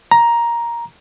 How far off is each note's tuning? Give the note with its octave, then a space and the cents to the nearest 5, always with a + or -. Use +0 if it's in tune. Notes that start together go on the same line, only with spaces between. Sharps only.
A#5 +10